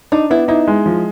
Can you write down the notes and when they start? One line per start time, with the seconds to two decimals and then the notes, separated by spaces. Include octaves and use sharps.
0.12 D4 D#4
0.30 B3 E4
0.48 D#4 E4
0.68 G#3
0.86 F3